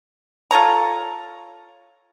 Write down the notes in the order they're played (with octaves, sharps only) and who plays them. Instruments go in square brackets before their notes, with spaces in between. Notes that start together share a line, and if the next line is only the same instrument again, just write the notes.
[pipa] F4 A4 C#5 A#5